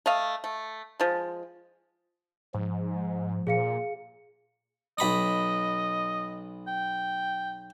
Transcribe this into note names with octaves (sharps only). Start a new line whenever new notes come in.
A3 D#5 F5
A3
F3 G#3
G#2 F3
A#2 G#4 F5 C#7
B1 D#5 B5 D#6
G5